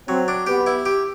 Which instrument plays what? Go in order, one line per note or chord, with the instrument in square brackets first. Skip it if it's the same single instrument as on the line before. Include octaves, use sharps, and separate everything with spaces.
[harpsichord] F#3 [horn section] C4
[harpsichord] D4
[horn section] B3 [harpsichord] G4
[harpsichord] E4
G4